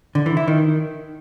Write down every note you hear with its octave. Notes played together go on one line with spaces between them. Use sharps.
D3
E3
E4
D#3